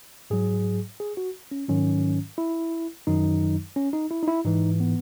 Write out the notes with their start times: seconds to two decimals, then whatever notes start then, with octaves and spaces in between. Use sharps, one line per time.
0.30 G#2 F#3 G#4
1.00 G#4
1.17 F#4
1.51 C#4
1.68 G#2 D#3 F#3 C#4
2.38 E4
3.07 F#2 D#3 F#3 D#4
3.76 C#4
3.93 D#4
4.11 E4
4.23 D#4
4.28 E4
4.45 G#2 E3 D#4
4.80 B3